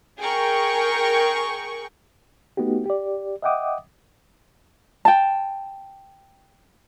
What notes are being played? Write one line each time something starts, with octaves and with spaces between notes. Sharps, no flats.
G#4 A#4 G5 C#6
A3 B3 D#4 F#4 G4
G4 D5
D#5 E5 F#5 G5 D6 D#6
G5 A5